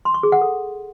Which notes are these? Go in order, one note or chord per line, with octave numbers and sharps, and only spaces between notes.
C6
C#6
G#4
F#5
A4